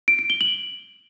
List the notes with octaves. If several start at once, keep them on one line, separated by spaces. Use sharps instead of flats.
D7
D7
G7
F#7